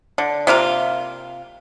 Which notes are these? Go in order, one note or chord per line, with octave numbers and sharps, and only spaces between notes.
D3
C3 A#3 F4 A#4